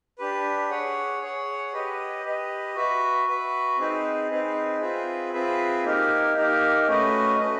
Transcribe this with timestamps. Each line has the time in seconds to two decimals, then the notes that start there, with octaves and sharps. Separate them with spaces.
0.19 D4 G4 B4
0.71 G#4 C#5 F#5
1.21 G#4 C#5 F#5
1.73 G4 B4 D#5
2.24 G4 B4 D#5
2.75 F#4 B4 E5
3.27 F#4 B4 E5
3.78 C4 D#4 G#4 B4
4.31 C4 D#4 G#4 B4
4.81 C4 F4 G#4 B4 E5
5.33 C4 F4 G#4 B4 E5
5.84 A#3 D#4 G4 A#4
6.36 A#3 D#4 G4 A#4
6.87 A3 C#4 F#4 B4 D#5
7.38 A3 C#4 F#4 B4 D#5